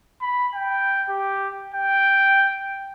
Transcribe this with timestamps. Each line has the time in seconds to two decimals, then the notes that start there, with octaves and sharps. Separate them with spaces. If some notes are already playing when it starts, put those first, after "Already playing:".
0.21 B5
0.55 G5
1.09 G4
1.74 G5